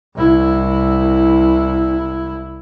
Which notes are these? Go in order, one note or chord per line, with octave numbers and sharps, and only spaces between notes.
C2 E4